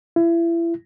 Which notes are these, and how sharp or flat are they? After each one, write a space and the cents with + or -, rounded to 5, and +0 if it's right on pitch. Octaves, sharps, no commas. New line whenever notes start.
E4 +30